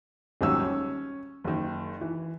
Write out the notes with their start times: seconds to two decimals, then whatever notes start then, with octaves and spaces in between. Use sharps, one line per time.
0.41 D#1 G#1 D#3 F#3 C#4 E6
0.63 C#4
1.44 F#1 D#3
2.01 E3